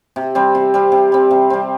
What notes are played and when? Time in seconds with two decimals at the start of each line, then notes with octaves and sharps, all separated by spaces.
0.16 C3
0.35 G3 C4
0.55 C3
0.74 G3 C4
0.92 C3
1.12 G3 C4
1.31 C3
1.50 G3 C4